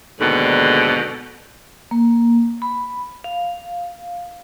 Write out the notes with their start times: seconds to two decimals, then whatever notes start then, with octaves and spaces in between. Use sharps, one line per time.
0.19 D#2 G#2 B2 D3
1.91 A#3
2.62 B5
3.24 F5